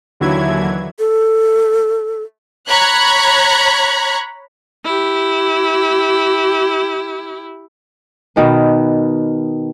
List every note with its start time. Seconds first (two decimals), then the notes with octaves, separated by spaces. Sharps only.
0.20 D#2 D3 E3 F#3 E4 G#6
0.99 A4
2.68 C#5 A#5 B5 F#6 G#6
4.85 E4 G4
8.36 B2 D#3 B4